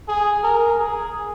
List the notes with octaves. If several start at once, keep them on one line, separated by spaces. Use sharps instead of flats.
G#4
A#4
G#4